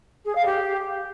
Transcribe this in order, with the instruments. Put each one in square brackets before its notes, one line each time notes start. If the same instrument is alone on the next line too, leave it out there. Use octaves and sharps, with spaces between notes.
[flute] G#4
F5
G4